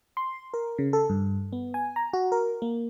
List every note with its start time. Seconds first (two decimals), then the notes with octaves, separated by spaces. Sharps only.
0.17 C6
0.54 A#4
0.78 C#3
0.93 A4
1.09 G2
1.53 B3
1.74 G#5
1.96 A#5
2.13 F#4
2.32 A#4
2.62 A#3